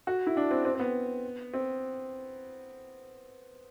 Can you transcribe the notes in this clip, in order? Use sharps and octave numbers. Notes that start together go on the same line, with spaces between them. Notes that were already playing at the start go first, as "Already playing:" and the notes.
F#4
E4
D4
C4
C4
C4
B3
C4